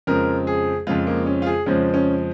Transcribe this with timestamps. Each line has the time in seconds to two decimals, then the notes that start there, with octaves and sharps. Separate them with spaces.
0.07 F2 C#3 F3 G#3 A#4
0.47 G#4
0.87 F2 C#3 F3 G#3 F4
1.07 A#3
1.26 C#4
1.42 F4
1.46 G#4
1.66 F2 C#3 F3 G#3 C#4
1.94 C#4